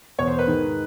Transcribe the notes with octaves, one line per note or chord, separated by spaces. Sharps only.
E2 B2 C#5
C5
B4
G#2 D#3